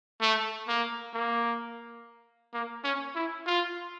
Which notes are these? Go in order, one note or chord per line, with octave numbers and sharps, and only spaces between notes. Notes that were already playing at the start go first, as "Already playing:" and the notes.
A3
A#3
A#3
A#3
C#4
E4
F4